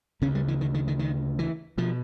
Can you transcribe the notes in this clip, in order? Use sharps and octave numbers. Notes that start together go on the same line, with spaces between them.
D2 C#3 C#4
G3
E3
D#3
D#3
D#3
D#3
E3
B2 F3